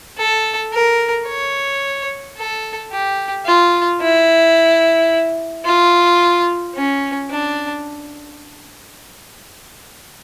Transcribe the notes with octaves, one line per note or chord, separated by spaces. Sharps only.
A4
A#4
C#5
A4
G4
F4
E4
F4
C#4
D4